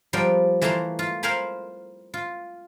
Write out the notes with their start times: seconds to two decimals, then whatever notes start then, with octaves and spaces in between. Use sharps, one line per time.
0.13 F3 G3 B3 A#4 G5
0.61 E3 A3 A#3 A5 A#5 C6
0.99 F4
1.23 A#4 C5 F5 G#5 B5
2.14 F4